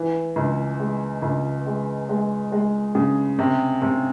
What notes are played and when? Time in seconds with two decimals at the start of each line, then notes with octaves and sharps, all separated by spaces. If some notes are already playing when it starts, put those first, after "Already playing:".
Already playing: E3
0.36 C#2
0.80 G#3
1.22 C#2
1.66 G#3
2.09 G#3
2.52 G#3
2.95 C#3
3.39 C3
3.82 C3